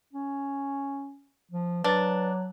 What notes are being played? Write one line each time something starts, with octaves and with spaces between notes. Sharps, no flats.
C#4
F3
F#3 D4 B4 A6